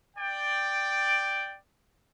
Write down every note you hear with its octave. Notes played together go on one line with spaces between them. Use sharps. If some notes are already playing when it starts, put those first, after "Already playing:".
D5 G5